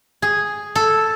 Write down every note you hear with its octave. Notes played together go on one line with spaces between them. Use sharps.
G#4
A4